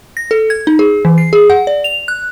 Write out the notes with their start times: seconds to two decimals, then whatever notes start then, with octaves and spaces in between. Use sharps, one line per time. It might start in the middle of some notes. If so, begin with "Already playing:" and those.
0.17 A#6
0.31 A4
0.50 G#6
0.67 D#4
0.79 G#4
1.05 E3
1.18 C7
1.33 G#4
1.50 F#5
1.67 D5
1.84 F7
2.08 F#6